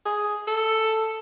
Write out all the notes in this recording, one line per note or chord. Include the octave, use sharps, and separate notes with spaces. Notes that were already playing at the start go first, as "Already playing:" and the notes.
G#4
A4